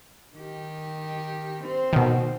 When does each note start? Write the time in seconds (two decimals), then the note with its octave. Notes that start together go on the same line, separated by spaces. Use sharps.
0.35 D#3 G4
1.63 C4 C5
1.93 B2 D#3